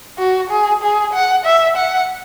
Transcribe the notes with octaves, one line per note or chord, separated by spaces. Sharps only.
F#4
G#4
G#4
F#5
E5
F#5